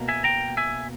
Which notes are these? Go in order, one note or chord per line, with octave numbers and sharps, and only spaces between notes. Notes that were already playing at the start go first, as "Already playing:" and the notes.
Already playing: B2 A#3
E5 G#5
G5 A#5
E5 G#5